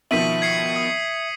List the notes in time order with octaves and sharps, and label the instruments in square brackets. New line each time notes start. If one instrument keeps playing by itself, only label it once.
[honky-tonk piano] B2 D#3 F3 [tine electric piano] E5 [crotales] B6 D#7 F#7
[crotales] G#6 C7 C#7
D#6